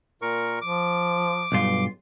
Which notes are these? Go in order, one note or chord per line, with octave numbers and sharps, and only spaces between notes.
A#2 A#4 C#6
F3 D6
B1 G2 F4